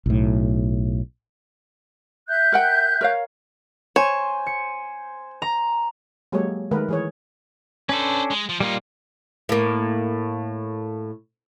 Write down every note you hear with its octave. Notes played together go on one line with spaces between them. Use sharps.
B1 A2
E5 F#6 G6
A#4 F#5 G5
A#4 C#5 F5
C5 C#5 G#5 E7
C#7
A#5
F#3 G#3 A#3 G4 A4 C#5
D#3 G#3 A3 A#4 B4
E3 G#4 C#5
C#4 D4 A4 B4 C5
G#3
F3
A#2 G3 A#3 D#4 F4
A2 A#3